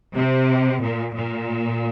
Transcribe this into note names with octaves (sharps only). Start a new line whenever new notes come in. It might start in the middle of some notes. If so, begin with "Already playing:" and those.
C3
A#2
A#2